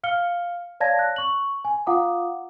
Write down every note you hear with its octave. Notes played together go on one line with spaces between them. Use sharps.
F5 F6 C#7 G7
C#5 D5 F5 A5 G#6 A#6
F#6
C#6 F#7
G#5
F4 F5 F#5 A#5 D6 D#6